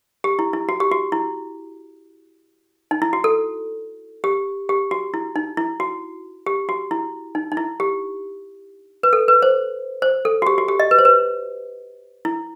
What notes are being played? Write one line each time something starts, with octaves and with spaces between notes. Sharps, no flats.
G4
E4
E4
F#4
G4
F#4
E4
D#4
E4
F#4
A4
G4
G4
F#4
E4
D#4
E4
F#4
G4
F#4
E4
D#4
D#4
E4
G4
B4
A4
B4
C5
C5
A4
F#4
G4
F#4
G4
D#5
B4
C5
B4
E4